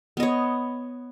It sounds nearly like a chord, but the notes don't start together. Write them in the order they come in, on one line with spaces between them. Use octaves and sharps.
B3 D#5 C#5